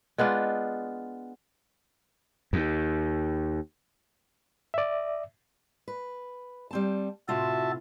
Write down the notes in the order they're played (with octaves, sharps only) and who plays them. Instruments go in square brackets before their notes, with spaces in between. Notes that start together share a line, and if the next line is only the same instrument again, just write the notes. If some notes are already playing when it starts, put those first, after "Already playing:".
[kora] G#3 B3 D4 F4
[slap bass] D#2
[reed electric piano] D5 E5
[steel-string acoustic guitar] B4
G3 C4 A5
[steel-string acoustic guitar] A2 C3 F4 [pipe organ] F#4 E5 A5